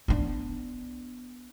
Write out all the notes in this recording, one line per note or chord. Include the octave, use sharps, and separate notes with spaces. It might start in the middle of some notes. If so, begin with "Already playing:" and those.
B3 D4